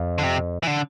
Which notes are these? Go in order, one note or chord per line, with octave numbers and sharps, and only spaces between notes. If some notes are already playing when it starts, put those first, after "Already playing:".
Already playing: F2
D3
C3
E3
D3